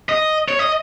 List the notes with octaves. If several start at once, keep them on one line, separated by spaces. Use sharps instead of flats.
D#5
C#5
D#5